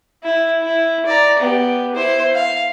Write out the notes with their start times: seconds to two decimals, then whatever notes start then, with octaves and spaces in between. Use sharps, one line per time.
0.24 E4
0.63 E4
1.06 D5 A#5
1.39 B3 G4
1.95 E4 C5
2.34 F5